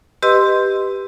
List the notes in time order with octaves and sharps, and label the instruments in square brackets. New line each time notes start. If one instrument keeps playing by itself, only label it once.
[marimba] G4 B4 D#5 C6 E6